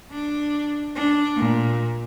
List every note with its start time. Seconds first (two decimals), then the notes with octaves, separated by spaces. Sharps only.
0.12 D4
0.96 D4
1.36 A#2